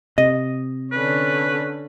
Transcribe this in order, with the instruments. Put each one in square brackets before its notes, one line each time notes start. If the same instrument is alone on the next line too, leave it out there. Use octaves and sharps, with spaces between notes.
[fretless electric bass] C3 [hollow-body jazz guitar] D#5
[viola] D3 C#4 [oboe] B4